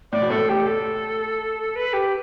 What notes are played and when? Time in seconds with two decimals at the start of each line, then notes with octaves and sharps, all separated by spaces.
0.12 A2 D5
0.22 B2
0.30 A2 A4
0.49 G4
0.67 A4
1.76 B4
1.93 G4